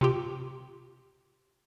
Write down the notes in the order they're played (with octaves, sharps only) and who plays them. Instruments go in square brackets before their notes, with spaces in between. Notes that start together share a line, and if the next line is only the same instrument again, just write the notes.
[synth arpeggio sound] C3 F4 G4